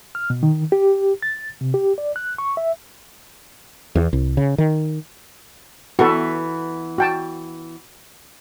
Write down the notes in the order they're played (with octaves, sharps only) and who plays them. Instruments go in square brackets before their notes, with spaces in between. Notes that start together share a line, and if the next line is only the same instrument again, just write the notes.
[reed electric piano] F6
B2
D#3
G4
A6
C3
G4
D5
F#6
C#6
E5
[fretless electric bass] E2
C2
C#3
D#3
[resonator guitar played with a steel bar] E3 B3 [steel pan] F#4 A4
[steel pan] F#4 G5 A5